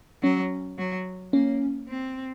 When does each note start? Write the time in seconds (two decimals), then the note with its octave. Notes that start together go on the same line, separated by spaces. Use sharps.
0.23 F#3 C#4
0.78 F#3
1.33 A#3 C#4
1.88 C4